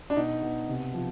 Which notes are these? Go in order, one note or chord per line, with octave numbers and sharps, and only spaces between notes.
D4
B2 D#4
B2
C3
F3